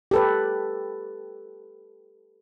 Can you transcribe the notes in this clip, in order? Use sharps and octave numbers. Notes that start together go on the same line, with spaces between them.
G4 A4 B4